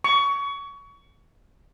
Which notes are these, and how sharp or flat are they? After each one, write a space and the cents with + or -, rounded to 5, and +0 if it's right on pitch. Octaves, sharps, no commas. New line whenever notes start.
C#6 +25